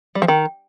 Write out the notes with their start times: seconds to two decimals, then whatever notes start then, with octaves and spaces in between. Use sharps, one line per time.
0.15 G3
0.22 F3
0.28 D#3